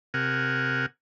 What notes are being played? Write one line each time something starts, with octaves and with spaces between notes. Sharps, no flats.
C3 A#4 F#5 G#5